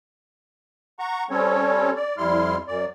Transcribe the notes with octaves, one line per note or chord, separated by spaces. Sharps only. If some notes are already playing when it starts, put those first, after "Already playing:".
F#5 A#5 C#6
G3 C4 C#4 A4 C#5
D5
F2 G3 E4 C6 F6
F#2 D5